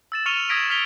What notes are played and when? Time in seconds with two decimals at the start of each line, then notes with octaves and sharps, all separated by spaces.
0.12 E6 A6 E7
0.26 C#6 F6 C#7 D#7 F7 G7
0.49 D#6 E6 G#6 A#6 B6 D7
0.70 F6 B6 C#7 E7 F7 G7